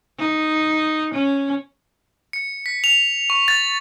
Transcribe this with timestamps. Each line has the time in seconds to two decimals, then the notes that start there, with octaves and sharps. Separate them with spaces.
0.19 D#4
1.14 C#4
2.33 C#7
2.66 B6
2.84 F7
3.30 C#6
3.48 A6